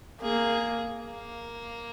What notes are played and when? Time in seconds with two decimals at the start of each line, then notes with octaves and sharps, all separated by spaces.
0.22 A#3 G#4
1.04 A#3